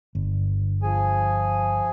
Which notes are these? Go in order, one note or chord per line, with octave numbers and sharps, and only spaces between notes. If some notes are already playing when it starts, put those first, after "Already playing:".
G1
F3 G#4 G#5